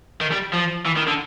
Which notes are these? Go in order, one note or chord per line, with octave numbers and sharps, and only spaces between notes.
D#3
G3
F3
E3
D#3
D3